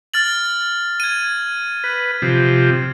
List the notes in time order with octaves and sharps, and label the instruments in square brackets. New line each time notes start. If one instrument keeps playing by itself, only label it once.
[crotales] F6 A6 F#7
G#6 D#7
[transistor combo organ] B4
C3 F3